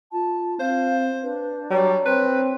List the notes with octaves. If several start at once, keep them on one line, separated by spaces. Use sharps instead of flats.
F4 A5
C4 C5 F5
D4 B4
F#3 G3 C#5
C4 B4